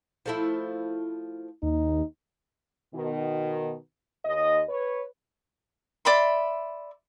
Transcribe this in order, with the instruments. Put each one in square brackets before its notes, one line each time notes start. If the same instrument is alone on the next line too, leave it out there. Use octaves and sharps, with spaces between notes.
[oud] F3 A3 E4
[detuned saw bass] D#2 [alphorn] D#4
[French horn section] B2 D#3
D#2 D#5
B4 C#5
[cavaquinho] D5 E5 B5 C6